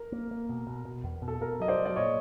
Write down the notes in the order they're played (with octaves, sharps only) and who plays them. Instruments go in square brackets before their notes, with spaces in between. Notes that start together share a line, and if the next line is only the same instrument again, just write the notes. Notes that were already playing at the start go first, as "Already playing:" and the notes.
Already playing: [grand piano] A#4
[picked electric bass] A#3
A#3
B2
B2
B2
E2
B2
[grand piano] A4
[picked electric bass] B2 [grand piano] A#4
[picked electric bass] F#3 [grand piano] D#5
[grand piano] C5 D5
[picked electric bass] F#3
[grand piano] D5
[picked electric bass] A#2 [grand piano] C#5 D#5